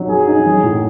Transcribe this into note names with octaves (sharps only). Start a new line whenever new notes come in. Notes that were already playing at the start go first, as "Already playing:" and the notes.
Already playing: F#3 D#4
F#4 G#4
D#4
F#3
A2